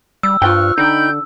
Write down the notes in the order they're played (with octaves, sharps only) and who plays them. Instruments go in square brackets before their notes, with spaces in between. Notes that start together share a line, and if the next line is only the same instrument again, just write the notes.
[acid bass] G3 [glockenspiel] E6
[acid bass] G2 [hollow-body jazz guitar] F4 C5 G5 [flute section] C#6 F6 F#6
[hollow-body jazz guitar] D3 [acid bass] D#4 [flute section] G5 B5 G6